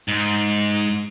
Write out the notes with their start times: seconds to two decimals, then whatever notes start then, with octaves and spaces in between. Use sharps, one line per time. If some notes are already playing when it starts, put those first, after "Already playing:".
0.08 G#2